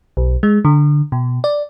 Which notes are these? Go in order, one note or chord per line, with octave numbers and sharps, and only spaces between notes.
B1
G#3
D3
B2
D5